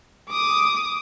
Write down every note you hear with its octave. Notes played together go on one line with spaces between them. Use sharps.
D6 D#6